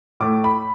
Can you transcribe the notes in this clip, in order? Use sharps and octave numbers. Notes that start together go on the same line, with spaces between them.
A2 A3 D6
B5